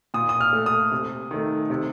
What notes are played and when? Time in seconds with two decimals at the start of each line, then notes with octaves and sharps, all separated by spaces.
0.14 A#2 D#6
0.29 D#6
0.41 F6
0.53 A3
0.66 D#6
0.92 C3
1.31 D#3 A3
1.70 C3